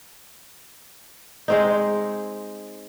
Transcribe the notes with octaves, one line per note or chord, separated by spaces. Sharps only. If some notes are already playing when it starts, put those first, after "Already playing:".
G#3 C4 D#4